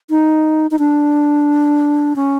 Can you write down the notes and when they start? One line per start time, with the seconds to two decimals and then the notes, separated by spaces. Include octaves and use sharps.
0.10 D#4
0.71 D#4
0.79 D4
2.16 C#4